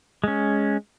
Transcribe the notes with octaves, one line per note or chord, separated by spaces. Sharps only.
G#3 C#4